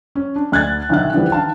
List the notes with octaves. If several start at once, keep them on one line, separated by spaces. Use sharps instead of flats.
C#4
D4
D2 F#6 G#6 A6
B1 D3 D#3 D#4 E5 F#6
D3 E3 F3 G3 B3
D#3 F5 A5